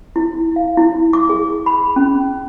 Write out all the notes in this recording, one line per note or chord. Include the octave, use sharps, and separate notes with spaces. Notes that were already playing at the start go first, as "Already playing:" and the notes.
E4
F5
E4
D6
G#4
B5
C#4